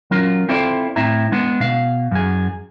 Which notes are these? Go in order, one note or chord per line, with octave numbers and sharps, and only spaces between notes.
F#3 C#4 F4 A#4
C4 E4 F4 A4 C5 D5
A2 C4 E4 E5 A#5
G#3 B3 D4
B2 F5
F#2 G#4